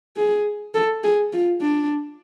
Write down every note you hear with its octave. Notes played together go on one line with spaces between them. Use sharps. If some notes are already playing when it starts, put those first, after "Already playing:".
G#4
A4
G#4
F4
D4